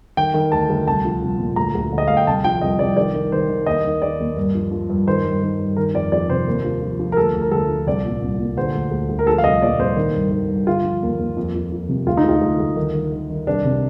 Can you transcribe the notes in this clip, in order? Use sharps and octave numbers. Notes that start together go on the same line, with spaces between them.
D#3 G5
D#3
D2 A5
D2
C2 A5
F3
C2
A#2
D2 A#5
D2
D3
D#5
D2 F5
G5
C2 A5
F3 G5
C2 D#5
C2 D5
D#3 D5
D#3
D#3 C5
D#3
D#2 D#5
D#3
D#3 D5
D#2
G2
F3
F3
G2
D#3 C5
G2
D#3
G2
D#3 A#4
F2 D5
F2 D5
C3 C5
D#2
F3
F3
F3
A#4
D2 A4
D2
A#4
D2 A4
F3
C2 D5
A#2
C2
A#2
D3 C5
D2
D2
D2
A#4
F3 A4
F5
C2 D#5
A#2 D5
C2 C5
D#3
G2
D#3
G2
D3 F4
F3
D#2
D#2
F2
F2
F2
C3
D2 F4
D#4
D2 F4
D2
D2
D#3
D#3
D#3
D#3
C2 D4
C3